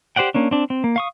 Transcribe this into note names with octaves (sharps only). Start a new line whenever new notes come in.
G4 C5 D5 F#5 G5
A#3 C#4 D4
C4 D4
C4
A#3
F5 C#6 D#6